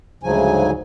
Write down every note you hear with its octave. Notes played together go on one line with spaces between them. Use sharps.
D2 G#2 C#3 F3 F#3 G#5